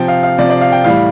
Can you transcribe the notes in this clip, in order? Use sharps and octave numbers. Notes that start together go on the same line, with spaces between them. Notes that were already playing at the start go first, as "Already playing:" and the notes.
Already playing: C3 F3 G5
F5
F5
C3 F3 D5
D5
F5
G5
A2 E3 G3 F5